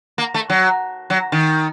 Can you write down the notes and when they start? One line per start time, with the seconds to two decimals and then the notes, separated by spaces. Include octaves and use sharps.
0.18 A#3
0.34 A3
0.50 F#3
1.10 F#3
1.32 D#3